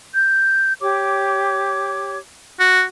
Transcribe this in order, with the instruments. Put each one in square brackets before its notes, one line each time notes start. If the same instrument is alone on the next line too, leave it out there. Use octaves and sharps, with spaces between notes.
[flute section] G6
G4 C#5 D6
[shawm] F#4